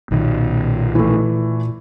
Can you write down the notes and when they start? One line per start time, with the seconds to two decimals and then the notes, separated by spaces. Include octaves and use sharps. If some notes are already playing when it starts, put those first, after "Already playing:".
0.11 B1 A#2 D#3
0.95 E3 A3